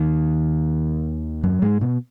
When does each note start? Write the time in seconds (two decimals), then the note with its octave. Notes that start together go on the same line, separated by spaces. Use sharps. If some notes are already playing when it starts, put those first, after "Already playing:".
Already playing: D#2 D#3
1.43 F#2 F#3
1.62 G#2 G#3
1.81 B2 B3